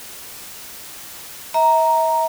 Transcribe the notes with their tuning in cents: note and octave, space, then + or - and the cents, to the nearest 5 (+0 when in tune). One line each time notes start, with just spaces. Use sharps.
E5 -35 A#5 +0